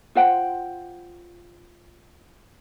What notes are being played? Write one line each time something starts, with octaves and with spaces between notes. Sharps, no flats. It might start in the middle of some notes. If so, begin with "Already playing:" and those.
F4 C5 F#5 G5